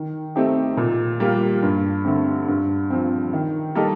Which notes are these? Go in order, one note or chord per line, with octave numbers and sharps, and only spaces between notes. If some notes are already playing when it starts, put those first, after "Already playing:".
Already playing: D#3
A3 C4 D#4 G4
A#2
G3 A#3 F4
G2
D3 A3 C4
G2
F3 C4
D#3
G3 A#3 D#4 A4